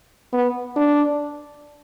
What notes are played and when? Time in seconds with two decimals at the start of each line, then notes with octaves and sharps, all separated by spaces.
0.33 B3
0.76 D4